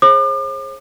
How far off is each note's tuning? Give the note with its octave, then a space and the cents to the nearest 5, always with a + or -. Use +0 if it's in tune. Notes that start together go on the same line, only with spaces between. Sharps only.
G#4 +10 C5 +45 D6 +40